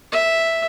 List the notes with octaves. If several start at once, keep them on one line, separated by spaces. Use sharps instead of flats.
E5